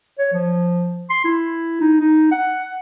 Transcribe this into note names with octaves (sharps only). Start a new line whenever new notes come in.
C#5
F3
C6
E4
D#4
D#4
F#5